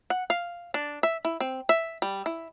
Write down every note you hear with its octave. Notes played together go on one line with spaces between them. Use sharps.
F#5
F5
D4
E5
E4
C4
E5
G3
E4